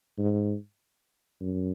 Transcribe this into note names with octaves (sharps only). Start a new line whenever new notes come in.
G#2
F#2